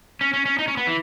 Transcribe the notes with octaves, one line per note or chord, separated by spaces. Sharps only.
C#4
C#4
C#4
D#4
C#4
B3
E3